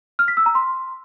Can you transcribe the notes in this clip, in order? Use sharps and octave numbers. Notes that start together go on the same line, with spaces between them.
F6
B6
E6
A#5
C6